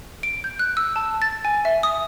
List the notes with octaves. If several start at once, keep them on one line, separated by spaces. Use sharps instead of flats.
D7
G6
F#6
E6
A5
A6
G#5
E5
D#6